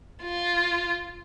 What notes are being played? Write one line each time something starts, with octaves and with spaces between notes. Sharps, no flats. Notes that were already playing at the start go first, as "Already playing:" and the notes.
F4